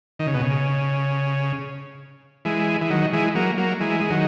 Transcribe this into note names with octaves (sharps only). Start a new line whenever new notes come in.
D#3
C#3
B2
C#3
E3 G#3
E3
D#3 F#3
E3 G#3
F#3 A#3
F#3 A#3
E3 G#3
G#3
D#3 F#3